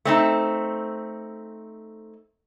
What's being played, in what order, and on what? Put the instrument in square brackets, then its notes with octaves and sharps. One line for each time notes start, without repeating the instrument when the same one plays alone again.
[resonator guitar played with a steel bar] A3 C4 D#4